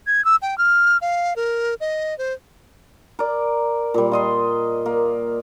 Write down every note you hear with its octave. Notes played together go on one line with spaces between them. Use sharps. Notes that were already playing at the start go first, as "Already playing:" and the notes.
G#6
E6
G5
F6
F5
A#4
D#5
C5
A#4 D5
A#2 G3
F4 D#5 C6
A#3